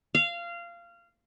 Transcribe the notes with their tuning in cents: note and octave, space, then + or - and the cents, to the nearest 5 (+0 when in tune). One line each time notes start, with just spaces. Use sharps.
F5 -20